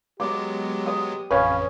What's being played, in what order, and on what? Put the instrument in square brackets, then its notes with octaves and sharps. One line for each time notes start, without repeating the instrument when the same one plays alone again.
[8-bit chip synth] F#3 G#3 B3 [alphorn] G4 [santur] D6
[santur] D#6
[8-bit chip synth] A1 F2 [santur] C#4 G#5 [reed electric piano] B4 C#5 F5